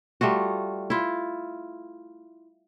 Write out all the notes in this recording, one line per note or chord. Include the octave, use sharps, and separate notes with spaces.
G3 A3 F4 F#4
E4 F4